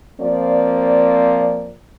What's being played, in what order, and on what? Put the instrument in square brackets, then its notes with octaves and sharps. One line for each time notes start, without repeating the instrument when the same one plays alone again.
[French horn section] F3 A#3 C4 D5